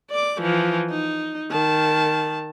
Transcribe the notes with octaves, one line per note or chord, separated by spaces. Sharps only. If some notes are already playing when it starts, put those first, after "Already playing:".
D5 D6
E3 F3
D#4
D#3 A5